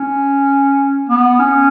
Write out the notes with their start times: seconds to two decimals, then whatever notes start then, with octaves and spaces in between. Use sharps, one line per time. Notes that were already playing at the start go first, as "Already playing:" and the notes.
Already playing: C#4
1.09 B3
1.39 C#4